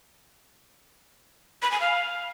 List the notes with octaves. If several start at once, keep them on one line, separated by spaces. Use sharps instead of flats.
B5
G#5
F5